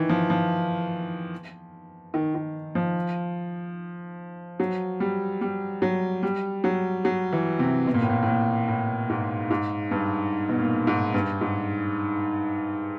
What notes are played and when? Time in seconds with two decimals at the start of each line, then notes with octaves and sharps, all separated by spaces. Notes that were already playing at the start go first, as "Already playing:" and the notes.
Already playing: D#3 E3
0.09 F3
0.30 F3
2.14 D#3
2.35 D#3
2.75 F3
4.60 F#3
5.00 G3
5.41 G3
5.82 F#3
6.23 G3
6.64 F#3
7.05 F#3
7.32 E3
7.59 C3
7.87 B2
7.94 A#2
8.02 A2
8.10 A#2
8.22 A2
8.28 A#2
8.68 A2
9.09 G#2
9.50 G#2
9.91 G2
10.49 B2
10.59 A#2
10.87 G#2
11.14 G2
11.41 G#2